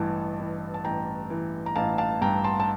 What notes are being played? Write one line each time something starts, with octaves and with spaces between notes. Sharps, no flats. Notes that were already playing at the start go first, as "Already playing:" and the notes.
Already playing: A1 G2 E3 A5
E3
A5
A1 G5 A#5
E3
A#5
A1 F5 A5
F5 A5
G2 G5 A#5
A5 C6
A5